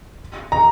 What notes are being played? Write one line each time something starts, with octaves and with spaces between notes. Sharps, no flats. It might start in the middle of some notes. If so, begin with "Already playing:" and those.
A#5